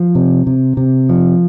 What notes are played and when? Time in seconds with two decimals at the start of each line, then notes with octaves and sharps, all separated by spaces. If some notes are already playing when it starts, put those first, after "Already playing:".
Already playing: F3
0.15 C3
0.47 C3
0.77 C3
1.09 F3